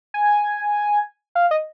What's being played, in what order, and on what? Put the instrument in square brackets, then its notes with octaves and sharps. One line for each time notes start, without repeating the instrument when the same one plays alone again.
[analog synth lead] G#5
F5
D#5